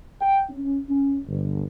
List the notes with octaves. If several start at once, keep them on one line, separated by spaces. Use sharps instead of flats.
G5
C#4
C#4
G1